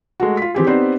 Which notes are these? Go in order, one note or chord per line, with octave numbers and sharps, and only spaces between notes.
G#3 A3 F#4
F4 B6
E3 C4 G4 G#4
B3 C4 D#4 G4 C5 D5